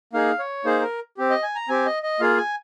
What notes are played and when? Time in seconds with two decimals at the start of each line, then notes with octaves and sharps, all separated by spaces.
0.13 A#3 D#4 G#4 F5
0.39 C#5
0.65 A#3 D#4 G#4 C5
0.82 A#4
1.17 C4 G4
1.30 D#5
1.43 G#5
1.55 A#5
1.68 C4 G4 G#5
1.86 D#5
2.03 D#5
2.20 A#3 F4 G#4 F5
2.37 G#5